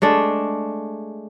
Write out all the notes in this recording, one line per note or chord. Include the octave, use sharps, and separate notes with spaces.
G#3 A3 D4